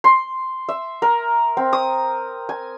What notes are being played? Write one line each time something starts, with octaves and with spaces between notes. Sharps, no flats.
C6
E5
A#4
C4
D#6
G#5